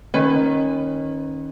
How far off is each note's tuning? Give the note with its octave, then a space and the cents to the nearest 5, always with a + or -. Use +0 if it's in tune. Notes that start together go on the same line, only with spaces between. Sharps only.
D#3 +0 C#4 -25 B4 +25